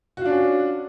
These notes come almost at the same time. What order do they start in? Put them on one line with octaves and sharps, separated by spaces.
F#4 F4 D4 C#4